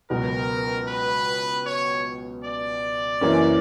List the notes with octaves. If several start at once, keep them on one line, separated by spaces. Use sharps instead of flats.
C#2 B2 F#3 B3 A#4
B4
C#5
D5
F#1 F#2 E3 A#3 C#4